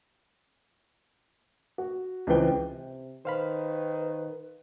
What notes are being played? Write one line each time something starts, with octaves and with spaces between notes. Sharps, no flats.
F#4
C#2 E3 C4 B4 G5
C3
D#3 B4 C5 F5 B5